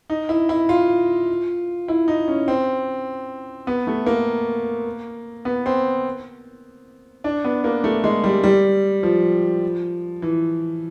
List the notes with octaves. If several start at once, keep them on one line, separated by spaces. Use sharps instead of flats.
D#4
E4
E4
F4
E4
D#4
C#4
C4
B3
A3
A#3
B3
C4
D4
B3
A#3
A3
G#3
G3
G3
F3
E3